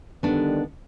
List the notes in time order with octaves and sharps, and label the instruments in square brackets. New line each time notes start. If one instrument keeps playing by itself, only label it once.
[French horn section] D3 D#3 G3 [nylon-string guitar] B3 D4